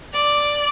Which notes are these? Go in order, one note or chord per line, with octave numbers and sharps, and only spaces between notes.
D5